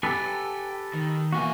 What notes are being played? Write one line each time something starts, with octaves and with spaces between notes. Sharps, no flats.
G4 A4 B4 G5 G#5
D#3
B2 E3 A#3 F#4 G#5